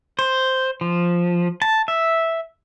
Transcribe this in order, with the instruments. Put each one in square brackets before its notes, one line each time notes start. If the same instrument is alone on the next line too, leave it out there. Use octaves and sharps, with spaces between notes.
[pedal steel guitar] C5
F3
A5
E5